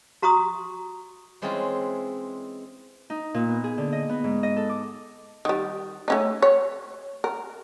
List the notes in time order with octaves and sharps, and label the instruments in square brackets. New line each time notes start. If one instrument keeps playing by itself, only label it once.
[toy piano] F#4 A#5 C6 C#6 D#6
[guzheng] E3 G#3 C4 C#4 E4 F4
[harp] D#4
A#2
B3
G#4
D3
D#5
B3
G#2
D#5
A4
D6
[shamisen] D#3 G3
A3 C#4 D#4
C#5
A#4